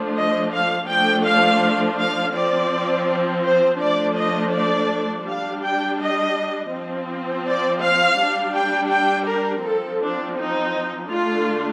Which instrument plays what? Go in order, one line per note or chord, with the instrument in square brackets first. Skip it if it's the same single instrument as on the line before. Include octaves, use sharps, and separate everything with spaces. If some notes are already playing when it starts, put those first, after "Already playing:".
Already playing: [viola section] F3 A3 D4
D#5
F5
F3 A3 D4 G5
F5
F5
F3 C4 D5
C5
F3 A3 D4 D5
D#5
D5
G3 D4 F5
G5
D#5
F3 C4
D5
F5
G3 D4
G5
G5
A#4
F3 C4 A4
D4
D#4
D3 A3 D4 F4